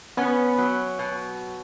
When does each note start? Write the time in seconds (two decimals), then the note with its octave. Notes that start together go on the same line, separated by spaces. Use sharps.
0.17 B3 C#4
0.58 F#3
0.99 B2